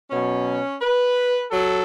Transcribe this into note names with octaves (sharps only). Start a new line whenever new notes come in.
B2 F#3 C#4
B4
F#3 A4